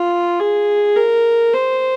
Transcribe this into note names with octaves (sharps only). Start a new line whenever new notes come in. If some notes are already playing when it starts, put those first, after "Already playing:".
Already playing: F4
G#4
A#4
C5